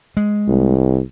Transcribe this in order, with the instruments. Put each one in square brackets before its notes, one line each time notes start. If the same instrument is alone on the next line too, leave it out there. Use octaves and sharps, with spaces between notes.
[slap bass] G#3
[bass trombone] C2